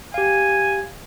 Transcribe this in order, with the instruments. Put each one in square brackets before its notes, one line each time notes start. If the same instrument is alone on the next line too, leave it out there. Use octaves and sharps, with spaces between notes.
[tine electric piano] G4 F5 [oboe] G#5